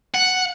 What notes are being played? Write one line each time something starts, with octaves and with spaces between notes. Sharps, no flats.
F#5